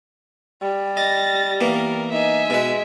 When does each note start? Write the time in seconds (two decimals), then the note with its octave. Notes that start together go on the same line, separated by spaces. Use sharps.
0.62 G3
0.97 D#5 A6 A#6
1.61 E3 A#3 B3 A#4
2.12 D#4 E5 G#5
2.50 B2 G#3 B4